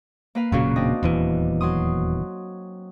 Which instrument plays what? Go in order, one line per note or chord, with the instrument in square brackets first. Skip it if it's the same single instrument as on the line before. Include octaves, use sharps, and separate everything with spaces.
[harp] A#3 B4 F5
[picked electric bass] E1 A#2 C#3 [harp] F#3 F#4 F5
[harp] C4 D4 D#5
[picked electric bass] D#1 E2 E3
[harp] F#3 C6 D#6